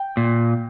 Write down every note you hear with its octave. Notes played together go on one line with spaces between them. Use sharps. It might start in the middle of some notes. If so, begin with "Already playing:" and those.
Already playing: G5
A#2